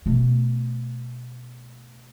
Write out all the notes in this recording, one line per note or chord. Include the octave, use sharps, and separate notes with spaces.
B2 A3